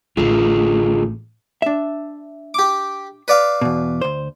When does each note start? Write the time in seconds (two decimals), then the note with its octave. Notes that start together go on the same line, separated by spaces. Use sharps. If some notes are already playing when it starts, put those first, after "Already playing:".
0.17 A1 D3 A3 F4 G#4
1.62 D4 E5
2.54 G4 D6
3.28 B4 D5 F5
3.61 E2 B2
4.01 D2 C5